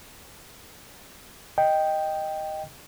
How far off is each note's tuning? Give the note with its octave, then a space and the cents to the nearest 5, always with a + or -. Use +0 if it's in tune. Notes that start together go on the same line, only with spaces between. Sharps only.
D#5 +0 G5 +0